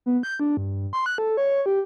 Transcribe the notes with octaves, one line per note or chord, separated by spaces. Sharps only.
B3
G6
D4
G2
C6
F#6
A4
C#5
G4